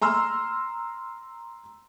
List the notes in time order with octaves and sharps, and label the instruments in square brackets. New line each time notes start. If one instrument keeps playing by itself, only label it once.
[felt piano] A#5 C6 E6 F6